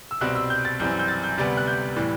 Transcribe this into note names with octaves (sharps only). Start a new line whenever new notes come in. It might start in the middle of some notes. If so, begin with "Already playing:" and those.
E6
C2 B2 G3 C4 F#6
E6
G6
A6
F#2 E3 G3 C4 G6
G6
A6
G6
D2 C3 G3 B3 A6
F#6
G6
A2 E3 G3